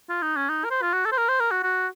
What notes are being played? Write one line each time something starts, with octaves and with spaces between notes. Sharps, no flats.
F4
D#4
C#4
D#4
A#4
C5
F4
F#4
A4
C5
A#4
C5
A#4
F#4
F#4